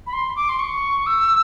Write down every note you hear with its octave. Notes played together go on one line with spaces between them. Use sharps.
B5
C6
D6
C6
C#6
E6